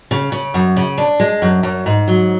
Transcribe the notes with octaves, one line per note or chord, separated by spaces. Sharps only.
C#3
C#3
F#2
C#3
D4
G#3
F#2
F#2
G#2
F#3